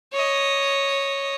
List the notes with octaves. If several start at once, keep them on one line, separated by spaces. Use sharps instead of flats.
C#5 D#5